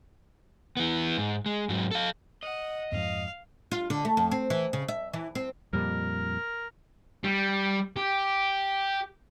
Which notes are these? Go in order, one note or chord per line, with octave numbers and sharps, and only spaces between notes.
E3 B3
G#2
G#3
G#2 F#3
A4 F5
D#5 F#5
F2 G#2 F3 F5
F4
D3
A3
F2
C4
E3
C#3
E5
E3
C4
F2 A#2 G3 A#4
G3
G4